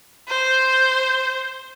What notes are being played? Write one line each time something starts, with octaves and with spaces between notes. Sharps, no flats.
C5